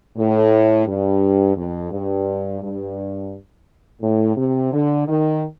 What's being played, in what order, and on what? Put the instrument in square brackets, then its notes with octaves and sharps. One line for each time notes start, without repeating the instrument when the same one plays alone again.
[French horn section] A2
G2
F2
G2
G2
A2
C3
D3
D#3